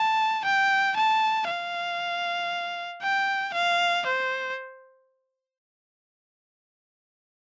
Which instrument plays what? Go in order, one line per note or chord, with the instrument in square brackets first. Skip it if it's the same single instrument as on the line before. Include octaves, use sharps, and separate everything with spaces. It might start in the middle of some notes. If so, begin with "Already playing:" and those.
Already playing: [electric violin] A5
G5
A5
F5
G5
F5
C5